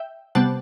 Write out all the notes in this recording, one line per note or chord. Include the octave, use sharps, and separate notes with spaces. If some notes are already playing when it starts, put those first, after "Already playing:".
Already playing: E5 G5
C3 G3 B3 F#5 A5